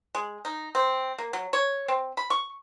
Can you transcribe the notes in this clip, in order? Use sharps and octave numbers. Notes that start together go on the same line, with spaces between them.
G#3
D#4
C4
A#3
F#3
C#5
C4
B5
C#6